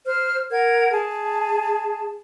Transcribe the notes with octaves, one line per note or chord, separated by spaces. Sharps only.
C5 F6
A#4 F#5 G#6
G#4 A5